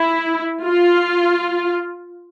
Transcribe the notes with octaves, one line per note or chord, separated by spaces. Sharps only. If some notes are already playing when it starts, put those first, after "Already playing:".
Already playing: E4
F4